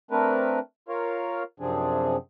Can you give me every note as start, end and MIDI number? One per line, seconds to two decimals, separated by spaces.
0.11 0.59 57
0.11 0.59 60
0.11 0.59 62
0.11 0.59 70
0.11 0.59 71
0.89 1.43 65
0.89 1.43 70
0.89 1.43 73
0.89 1.43 77
1.60 2.16 42
1.60 2.16 48
1.60 2.16 53
1.60 2.16 60
1.60 2.16 62
1.60 2.16 68